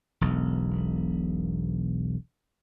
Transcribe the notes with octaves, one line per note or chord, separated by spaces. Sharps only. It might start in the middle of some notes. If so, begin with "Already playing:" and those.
E1 B1